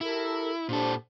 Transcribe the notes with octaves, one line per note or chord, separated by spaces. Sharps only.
E4 G4 A4 A#4
A#2 D4 G4 A4 C5